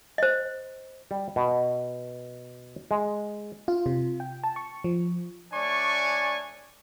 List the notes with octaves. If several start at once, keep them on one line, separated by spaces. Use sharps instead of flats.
C5 D#5
G3
B2
G#3
F4
C3
G5
A5
C#6
F3
A3 D4 C#5 D5 G#5 C#6